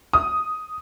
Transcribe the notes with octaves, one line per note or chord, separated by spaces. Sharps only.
D#6